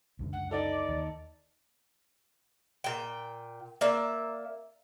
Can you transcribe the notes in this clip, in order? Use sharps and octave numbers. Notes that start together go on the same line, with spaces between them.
C#2 F#2 D3
F#5
D#4 A4 D5
D#2
A#2 G5
A#3 D5 E5